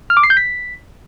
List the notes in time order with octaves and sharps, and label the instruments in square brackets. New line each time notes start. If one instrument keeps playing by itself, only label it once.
[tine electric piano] F6
D6
C7
G6
B6